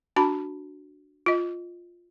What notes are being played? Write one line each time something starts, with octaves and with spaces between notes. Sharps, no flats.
D4 F#4 A5 B5
F4 D#5